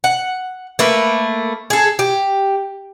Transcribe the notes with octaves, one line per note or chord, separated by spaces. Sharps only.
F#5
A3 A#3 B4
G#4 A4
G4